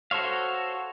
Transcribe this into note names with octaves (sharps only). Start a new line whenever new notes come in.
F#4 A4 C5 C#5 F5